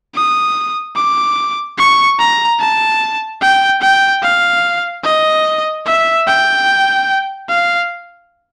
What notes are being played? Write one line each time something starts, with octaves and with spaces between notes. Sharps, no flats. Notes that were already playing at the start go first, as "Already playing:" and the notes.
D#6
D6
C#6
A#5
A5
G5
G5
F5
D#5
E5
G5
F5